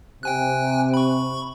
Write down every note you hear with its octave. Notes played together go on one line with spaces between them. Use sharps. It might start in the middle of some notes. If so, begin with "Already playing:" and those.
C3 G5 G#5 F#6
B5 C#6